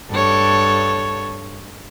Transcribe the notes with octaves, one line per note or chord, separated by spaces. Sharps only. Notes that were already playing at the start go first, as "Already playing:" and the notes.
G2 A4 C#5